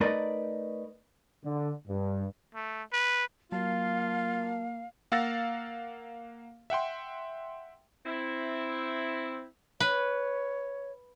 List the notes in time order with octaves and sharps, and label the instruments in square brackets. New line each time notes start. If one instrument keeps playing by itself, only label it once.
[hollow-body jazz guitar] A3 D#4 A#4 B4 D5 D#5
[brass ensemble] D3
G2
[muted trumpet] A3
B4
[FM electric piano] F#3 A5 [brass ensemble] A#3 [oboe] F4 [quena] F5
[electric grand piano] A#3 F5 F#5 E6 A6 A#6
E5 F#5 G5 C6
[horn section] C4 E4
[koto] B4 [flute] C#5